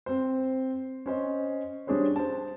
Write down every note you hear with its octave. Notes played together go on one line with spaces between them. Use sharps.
C4 C5
C#4 C5 D#5
G3 C#4 D4 G#4 C5 C#5
C5 A5